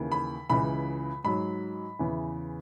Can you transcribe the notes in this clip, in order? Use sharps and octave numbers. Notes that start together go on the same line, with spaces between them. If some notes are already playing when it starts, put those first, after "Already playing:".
Already playing: D#2 C#3 E3
B5
C#2 C#3 E3 B5
G#2 F#3 B5
E2 C#3 E3